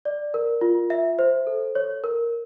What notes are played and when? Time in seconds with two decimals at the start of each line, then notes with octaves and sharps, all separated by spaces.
0.05 D5
0.34 A#4
0.61 F4
0.90 E5
1.19 C5
1.47 A4
1.75 C#5
2.04 A#4